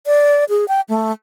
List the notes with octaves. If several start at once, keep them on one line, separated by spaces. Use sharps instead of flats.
D5
G#4
G5
A3